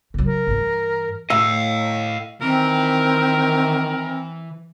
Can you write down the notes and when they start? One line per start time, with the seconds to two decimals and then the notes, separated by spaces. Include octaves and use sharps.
0.14 C#3 F#3
0.26 A#4
0.47 G2 E3
1.30 A2 D#5 F5 E6
2.42 D#3 E3 C4 A#4